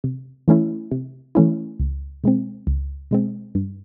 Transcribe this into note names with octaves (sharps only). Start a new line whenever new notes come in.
C3
E3 A3 C#4 E4
C3
E3 A3 C#4 E4
C#2
B2 G#3 C4
C#2
B2 G#3 C4
G2